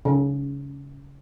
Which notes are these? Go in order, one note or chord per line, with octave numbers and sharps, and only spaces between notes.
C#3